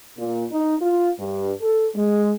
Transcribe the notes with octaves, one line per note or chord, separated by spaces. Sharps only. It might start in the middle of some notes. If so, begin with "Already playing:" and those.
A#2
D#4
F4
G2
A4
G#3